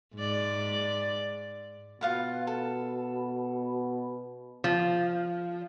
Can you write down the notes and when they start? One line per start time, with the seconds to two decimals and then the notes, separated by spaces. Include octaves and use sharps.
0.16 G#2 D5
2.01 B2 F4 F5 F#5
2.47 A4
4.64 F3